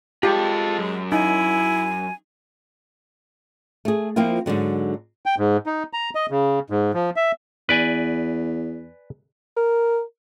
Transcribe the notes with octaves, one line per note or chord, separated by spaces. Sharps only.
G#3 F4 G4 A4 G5
F#2
D#4 E4 G#5
A3 G#4
F3 A#3 C4 E4 F4
G#2 B2 D3 F#3
G5
G#2
D#4
A#5
D#5
C#3
G#2
F3
E5
E2 B4 D5 G#5
A#4